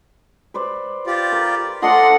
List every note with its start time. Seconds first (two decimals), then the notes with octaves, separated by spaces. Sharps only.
0.54 B4 C5 D5
1.07 F4 G4 D5
1.32 A#4
1.82 F3 A3 D4 F4 D#5 F#5 C6